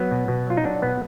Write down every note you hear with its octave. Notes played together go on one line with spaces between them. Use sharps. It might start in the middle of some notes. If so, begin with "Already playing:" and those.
Already playing: F#3 B3
B2
B2
F#3 F4
D#4
F#3 D4
B2 B3